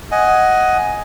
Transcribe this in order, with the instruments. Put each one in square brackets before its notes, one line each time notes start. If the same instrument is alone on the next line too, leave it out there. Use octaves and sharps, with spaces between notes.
[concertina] D#5 F#5 G#5